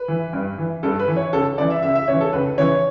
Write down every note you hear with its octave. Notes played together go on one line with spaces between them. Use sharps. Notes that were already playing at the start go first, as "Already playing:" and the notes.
Already playing: B4
E3
G2
E3
G2 A4
B4
E3
C#5
C#2 A4
C#3 E3 D5
E5
C#2 E5
E5
C#3 E3 C#5
A4
C#2 B4
C#3 E3 C#5